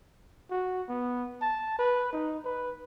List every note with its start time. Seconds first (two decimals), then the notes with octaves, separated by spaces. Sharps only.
0.51 F#4
0.89 B3
1.42 A5
1.79 B4
2.13 D#4
2.45 B4